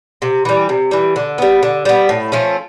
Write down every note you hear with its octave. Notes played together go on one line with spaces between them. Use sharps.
C3
E3 G3
C3
E3 G3
D3
G3 B3
D3
G3 B3
A2
F3 A3 C#4